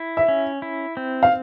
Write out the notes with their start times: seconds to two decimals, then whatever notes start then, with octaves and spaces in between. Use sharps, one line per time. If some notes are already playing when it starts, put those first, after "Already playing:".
Already playing: E4
0.17 E5
0.28 C#4
0.62 E4
0.97 C4
1.23 F5